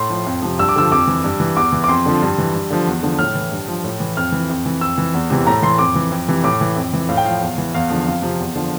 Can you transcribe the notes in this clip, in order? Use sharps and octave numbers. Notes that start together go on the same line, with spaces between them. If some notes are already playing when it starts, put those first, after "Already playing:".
Already playing: A2 C6
F3
F2
C3 F3
G2 E6
D6
D3 F3 E6
F2 D6
E3
G2
E3
E2 D6
E3
D6
F2 C6
D3 F3
G2
E3
G2
D3 F3
E2
D3 F3
A2 F6
E3
G2
F3
A2
E3
F2 F6
E3
F2
E3
F2 E6
E3
E2
C3 E3
A2 A#5
E3 C6
F2 D6
E3
F2
C3 E3
A2 D6
E3
F2
E3
A2 F5
G5
F3 F5
E2
E3
E2 F5
D3 F3
F2 F5
C3 F3
E2
D3 F3